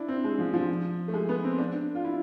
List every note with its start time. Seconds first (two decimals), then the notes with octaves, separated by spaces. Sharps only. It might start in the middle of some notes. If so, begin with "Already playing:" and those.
Already playing: D4 E4
0.08 C4
0.24 G#3
0.39 F3
0.54 F3
1.08 A3
1.13 G#3
1.29 B3
1.44 C4
1.58 D4
1.95 F4
2.04 E4